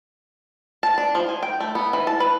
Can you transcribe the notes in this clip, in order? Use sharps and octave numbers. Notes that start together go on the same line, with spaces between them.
A5
D4
F3
G#5
G5
A3
B3
E3
A5
B4